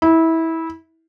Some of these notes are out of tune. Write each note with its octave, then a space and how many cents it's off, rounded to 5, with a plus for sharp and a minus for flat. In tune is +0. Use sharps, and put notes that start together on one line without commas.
E4 -20